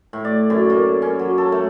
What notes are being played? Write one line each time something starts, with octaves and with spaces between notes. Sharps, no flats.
A2
D5
F#2
A#3
C#4
F#3
A4
A3